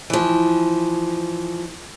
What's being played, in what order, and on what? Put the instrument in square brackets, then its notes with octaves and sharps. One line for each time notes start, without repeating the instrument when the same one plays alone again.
[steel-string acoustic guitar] E3 F3